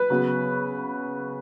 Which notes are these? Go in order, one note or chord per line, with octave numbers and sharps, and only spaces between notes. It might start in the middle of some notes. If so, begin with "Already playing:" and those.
Already playing: B4
C#3 F#3 B3